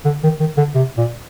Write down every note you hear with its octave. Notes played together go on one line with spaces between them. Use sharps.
D3
D#3
D#3
D3
C3
A#2